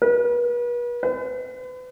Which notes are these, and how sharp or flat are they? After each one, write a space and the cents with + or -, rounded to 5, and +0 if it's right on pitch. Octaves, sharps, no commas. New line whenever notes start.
B4 -40
B4 +40